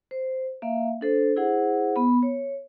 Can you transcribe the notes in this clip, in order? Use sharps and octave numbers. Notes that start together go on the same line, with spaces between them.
C5
A#3 E5 F5
D4 A4 C5
E4 G#4 C5 F#5
B3 B5
C#5